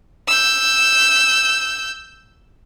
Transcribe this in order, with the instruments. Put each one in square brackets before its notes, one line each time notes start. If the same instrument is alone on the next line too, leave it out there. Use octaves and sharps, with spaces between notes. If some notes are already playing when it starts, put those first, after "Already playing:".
[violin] E6 G6